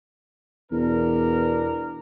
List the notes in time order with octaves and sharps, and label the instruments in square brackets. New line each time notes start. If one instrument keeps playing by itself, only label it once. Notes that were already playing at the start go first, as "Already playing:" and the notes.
[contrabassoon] E2 [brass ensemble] B2 D4 A#4